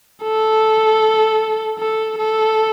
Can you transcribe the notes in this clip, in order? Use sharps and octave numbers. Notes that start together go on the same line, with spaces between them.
A4
A4
A4